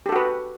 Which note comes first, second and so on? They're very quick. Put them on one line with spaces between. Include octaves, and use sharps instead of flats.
G4 A4 F#4 B4